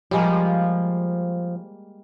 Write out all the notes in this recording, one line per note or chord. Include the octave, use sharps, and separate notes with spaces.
F3 G3 G#3 A#3